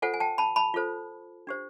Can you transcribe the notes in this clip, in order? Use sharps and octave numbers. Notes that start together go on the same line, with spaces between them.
F4 A4 C5 F#5 G#5
G#5
G5 A5
A5 B5
A5 B5
F4 A4 C5
D4 G4 C5